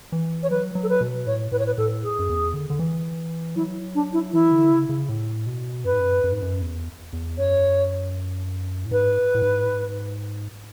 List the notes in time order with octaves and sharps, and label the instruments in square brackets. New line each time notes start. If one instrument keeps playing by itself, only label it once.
[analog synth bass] E3
[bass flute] C#5
[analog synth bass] F#3 [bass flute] B4
[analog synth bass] F#3
[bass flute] A4
B4
[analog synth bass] B2
[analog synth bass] A2 [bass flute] C#5
[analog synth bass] A2 [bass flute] B4
[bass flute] C#5
B4
[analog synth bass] A2 [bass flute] A4
[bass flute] G#4
[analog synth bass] F#2
E2
D3
D3
E3
[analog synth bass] F#3 [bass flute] E4
[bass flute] D4
E4
[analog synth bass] E3 [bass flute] E4
[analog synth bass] D3
C#3
C#3
A2
B2
[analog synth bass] F#2 [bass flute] B4
[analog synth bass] G#2
F#2
F#2
G#2
F#2
E2
E2
[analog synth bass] F#2 [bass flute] C#5
[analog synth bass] A2
[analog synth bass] G#2 [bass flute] B4
[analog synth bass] A2
G#2
A2
G#2